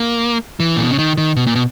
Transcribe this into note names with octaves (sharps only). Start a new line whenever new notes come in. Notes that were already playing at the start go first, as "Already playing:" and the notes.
Already playing: A#3
E3
A#2
B2
C#3
D#3
D#3
B2
A#2
B2